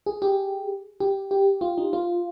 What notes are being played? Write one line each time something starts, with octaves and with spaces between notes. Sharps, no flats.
G#4
G4
G4
G4
F4
D#4
F4